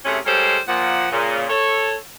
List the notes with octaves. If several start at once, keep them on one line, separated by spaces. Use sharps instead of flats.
C3 A3 C#4 E4 G#4
G3 G#3 A4 A#4 C5 C#5
A#2 F3 F#5
A#2 C#3
A4 C#5